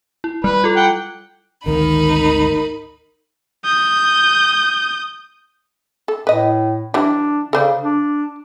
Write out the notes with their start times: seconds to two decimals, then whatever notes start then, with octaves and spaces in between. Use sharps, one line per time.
0.24 E4
0.44 G3 B4
0.64 F4 A4
0.76 F#5 G5
1.66 G#1 D2 D#3 D#4 A#4 B5
3.65 D#6 G6
6.08 A4
6.27 A2 B4 D#5
6.94 E3 F#3 G3 D4
7.53 C#3 A4 C5 D5
7.83 D4